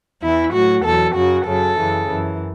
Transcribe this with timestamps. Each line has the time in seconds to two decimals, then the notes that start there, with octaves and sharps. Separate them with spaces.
0.22 E2 E3 E4
0.53 A2 F#3 F#4
0.84 E2 B2 F#3 A4
1.15 F#2 C#3 F#3 F#4
1.46 F#2 C#3 F#3 A4
1.78 F#2 C#3 E3
2.09 F#2 E3